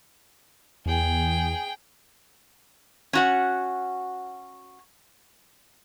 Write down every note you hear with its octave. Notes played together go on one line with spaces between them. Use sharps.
E2 G#4 G5
C#4 F#4 F#5